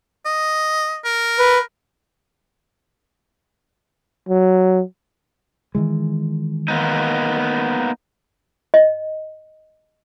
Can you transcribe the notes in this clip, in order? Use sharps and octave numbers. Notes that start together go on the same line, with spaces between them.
D#5
A#4
B4
F#3
D#3 E3 G#3
A#3 B3 D#4
D#5